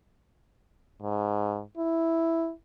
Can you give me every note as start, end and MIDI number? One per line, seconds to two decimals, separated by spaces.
1.01 1.61 44
1.77 2.50 64